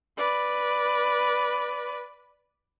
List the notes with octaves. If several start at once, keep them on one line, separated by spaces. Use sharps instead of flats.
B4 D5